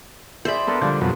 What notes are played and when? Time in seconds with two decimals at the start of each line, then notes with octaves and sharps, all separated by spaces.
0.45 G#4 C5 D5 E5 B5
0.67 B3 D4 A4 A#4
0.81 D3 F3 G3 G6
1.01 F2 B2 F#3